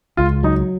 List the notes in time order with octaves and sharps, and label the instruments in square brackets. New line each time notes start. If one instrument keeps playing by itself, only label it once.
[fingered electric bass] C#2 [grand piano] F4
[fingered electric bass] F#3 [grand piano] D#4